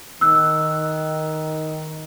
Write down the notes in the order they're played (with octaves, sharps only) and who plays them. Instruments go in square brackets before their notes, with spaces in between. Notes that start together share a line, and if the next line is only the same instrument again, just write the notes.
[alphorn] D#3 [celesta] E6 F#6